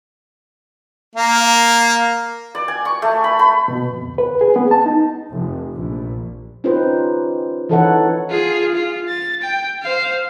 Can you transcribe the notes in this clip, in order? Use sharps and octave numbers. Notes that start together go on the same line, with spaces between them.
A#3
D5
G#5
C#6
A3
B5
B5
B2
F2
D2
B4
G#4
B3
A5
D#4
F1
A#1
C#4 D#4 F4 G4 B4 C5
E3 D#4 A4 B4 C#5 F#5
F4 G#4
F4
A6
G5
C5 F5